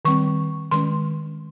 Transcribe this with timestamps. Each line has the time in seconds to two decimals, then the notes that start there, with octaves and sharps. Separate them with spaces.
0.05 D#3 G3 C4 C#6
0.71 D#3 G#3 C#4 C6